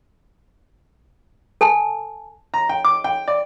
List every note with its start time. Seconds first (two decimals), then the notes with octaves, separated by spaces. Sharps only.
1.61 A4 G#5 A5
2.54 A#5
2.69 G5
2.85 D6
3.04 G5
3.28 D5